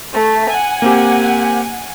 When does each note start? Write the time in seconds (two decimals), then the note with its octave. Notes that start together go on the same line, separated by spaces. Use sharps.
0.13 A3
0.48 F#5 G#5
0.82 A#3 C4 G4